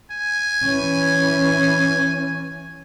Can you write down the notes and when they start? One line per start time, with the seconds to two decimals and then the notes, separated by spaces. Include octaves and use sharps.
0.11 G#5
0.63 E3 C#4